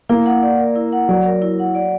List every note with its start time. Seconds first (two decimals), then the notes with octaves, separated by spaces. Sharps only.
0.09 A#3 E4
0.26 F#5
0.42 D5
0.60 A#4
0.76 E4
0.93 F#5
1.09 F#3 D5
1.26 A#4
1.42 E4
1.59 F#5
1.75 D5